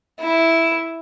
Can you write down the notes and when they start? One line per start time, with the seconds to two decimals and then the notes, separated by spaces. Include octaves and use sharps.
0.21 E4